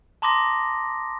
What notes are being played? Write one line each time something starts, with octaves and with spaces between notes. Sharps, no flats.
A5 A#5 C6 D6 D#6 A#6